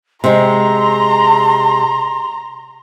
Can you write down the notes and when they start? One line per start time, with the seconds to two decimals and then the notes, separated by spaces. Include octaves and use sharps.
0.24 C3 G#3 A#5 C6